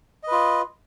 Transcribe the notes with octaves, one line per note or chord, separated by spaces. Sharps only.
F4 B4 D#5